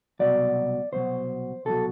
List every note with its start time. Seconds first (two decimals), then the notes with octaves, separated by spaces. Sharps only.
0.19 C2 B2 F#3 D5
0.92 C2 B2 F#3 C5
1.65 C2 B2 F#3 A4